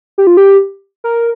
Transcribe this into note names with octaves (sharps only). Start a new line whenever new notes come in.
G4
F4
G4
A#4